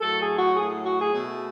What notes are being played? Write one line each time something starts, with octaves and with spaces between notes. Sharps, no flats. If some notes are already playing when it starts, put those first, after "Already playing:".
A2 F#3 A3 A4
G#4
F#4
A2 F#3 A3 G#4
F#4
G#4
B2 A3